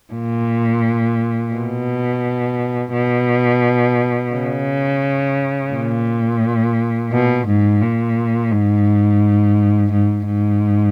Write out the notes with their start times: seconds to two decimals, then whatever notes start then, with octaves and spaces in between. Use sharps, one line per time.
0.14 A#2
1.54 B2
2.93 B2
4.33 C#3
5.73 A#2
7.13 B2
7.48 G#2
7.82 A#2
8.52 G#2
9.92 G#2
10.27 G#2